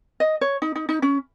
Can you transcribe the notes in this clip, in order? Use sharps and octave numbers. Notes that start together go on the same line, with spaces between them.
D#5
C#5
D#4
D#4
D#4
C#4